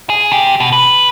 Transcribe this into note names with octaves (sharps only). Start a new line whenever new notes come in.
G#4
C3 G4
B2
B4